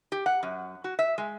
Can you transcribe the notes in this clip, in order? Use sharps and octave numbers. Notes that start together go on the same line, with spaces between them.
G4
F#5
F#2
F#4
E5
G#3